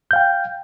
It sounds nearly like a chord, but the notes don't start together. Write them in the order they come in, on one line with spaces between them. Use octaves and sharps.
G6 F5 G5